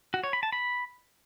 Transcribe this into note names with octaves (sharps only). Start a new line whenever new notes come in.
F#4
C#5
B5
A5
B5